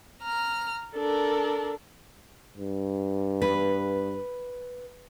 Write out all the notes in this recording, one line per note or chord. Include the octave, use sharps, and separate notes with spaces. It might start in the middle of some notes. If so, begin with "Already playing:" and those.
A#5 F6
D4 A4 A#4
G2
B4